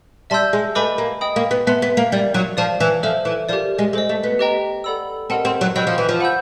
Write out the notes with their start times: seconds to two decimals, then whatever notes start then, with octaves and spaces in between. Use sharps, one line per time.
0.30 G3 E5 A5 C6 E6 G6
0.53 G#3
0.75 A3 B4 D#5 G#5 B5 D6
0.98 A#3
1.21 D#5 G5 B5 D#6
1.36 A#3
1.51 B3
1.67 B3 E5 A5 C6
1.82 B3
1.97 A#3
2.12 G3 A#4 D5 F5
2.34 F#3
2.57 F3 D5 F5 A5
2.80 E3
3.03 F3 A4 C5 E5
3.25 E3
3.49 F3 G4 A#4 D5
3.79 G#3
3.93 G#3 A4 C5 D#5
4.09 A3
4.23 B3
4.39 G4 B4 D#5 G5 A#5
4.84 A4 D5 F#5 B5 E6
5.30 C4 G4 A#4 D#5 F#5 A5
5.45 C4
5.61 F#3
5.76 F#3 D#5 G5 B5 E6 G6
5.87 F3
5.98 E3
6.09 F3
6.20 F#5 B5 E6 G6